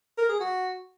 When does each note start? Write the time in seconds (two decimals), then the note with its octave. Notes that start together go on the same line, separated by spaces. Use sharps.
0.18 A#4
0.29 G#4
0.40 F#4